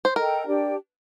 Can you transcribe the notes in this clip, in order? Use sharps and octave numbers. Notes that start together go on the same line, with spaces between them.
C5
A4 A#4 D#5 G5 A#5
D4 G4 D5 G5